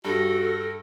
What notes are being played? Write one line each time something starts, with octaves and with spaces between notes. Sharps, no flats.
G2 F#4 A4 A#6